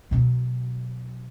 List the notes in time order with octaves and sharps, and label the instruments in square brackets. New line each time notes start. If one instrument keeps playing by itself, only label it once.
[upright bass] B2 F#3